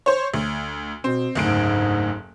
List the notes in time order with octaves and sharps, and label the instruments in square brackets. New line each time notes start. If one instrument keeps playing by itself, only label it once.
[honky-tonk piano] C5 C#5
D2
[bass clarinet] B2 [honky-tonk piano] C4
[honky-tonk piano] F#1 D2 D7 [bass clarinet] G#2